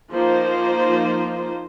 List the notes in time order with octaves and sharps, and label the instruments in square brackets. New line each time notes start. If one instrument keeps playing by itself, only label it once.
[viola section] F3 A#3 D#4 C5